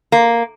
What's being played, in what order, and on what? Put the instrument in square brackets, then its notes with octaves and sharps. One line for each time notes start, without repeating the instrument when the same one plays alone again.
[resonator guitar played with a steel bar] A#3